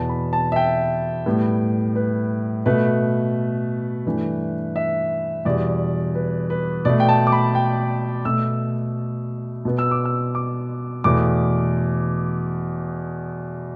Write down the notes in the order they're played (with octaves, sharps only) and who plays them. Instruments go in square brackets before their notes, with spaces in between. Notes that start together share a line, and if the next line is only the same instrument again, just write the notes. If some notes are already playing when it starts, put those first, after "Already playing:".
Already playing: [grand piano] E2 B2 B3 A5
B5
A5
E5
G5
A2 G3 B3
B4
B2 A3 B4
G2 E3 A3
E5
E2 B2 G3 D5
B4
B4
B2 A3 D5
G5
A5
D6
B5
G5
B2 A3 E6
B2 B3
E6
D6
E6
D6
E2 B2 A3 D6